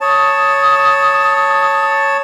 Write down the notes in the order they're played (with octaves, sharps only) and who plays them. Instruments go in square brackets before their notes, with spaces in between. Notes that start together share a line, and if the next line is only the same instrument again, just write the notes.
[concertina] C#5 A5 [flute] D#6